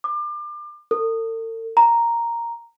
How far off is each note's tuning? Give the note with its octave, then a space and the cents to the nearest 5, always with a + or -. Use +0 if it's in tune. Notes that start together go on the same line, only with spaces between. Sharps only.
D6 +30
A4 +45
A#5 +0